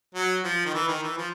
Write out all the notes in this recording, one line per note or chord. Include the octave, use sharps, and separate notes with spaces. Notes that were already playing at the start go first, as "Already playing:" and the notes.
F#3
F3
D#3
E3
D#3
E3
F3